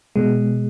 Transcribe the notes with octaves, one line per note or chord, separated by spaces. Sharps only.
B2 G#3